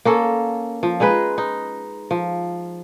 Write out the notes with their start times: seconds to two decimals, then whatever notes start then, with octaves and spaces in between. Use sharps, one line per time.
0.05 A#3 C#4 A4
0.83 F3
1.00 G#3 D#4 G#4 B4
1.38 D#4
2.11 F3